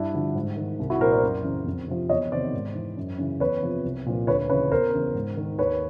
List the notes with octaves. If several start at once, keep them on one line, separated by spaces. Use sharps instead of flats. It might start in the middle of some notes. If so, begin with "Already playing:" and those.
Already playing: G2 D4 E4
D3 F3
G#2
D#3
C2
E4 F#4
A#2 F3 A#4 C5
C5 D5
F#2
C#3 E3
F2
C3 F3
E2 C#5 D#5
C3 D#3 C5 D5
G#2
E3
F#2
C#3 E3
E2 B4 C#5
C3 F3
C2
A#2 F3
D2 B4 C#5
C#3 E3 B4 C#5
E2 A#4 C5
C#3 E3
G#2
D#3
D#2 B4 C#5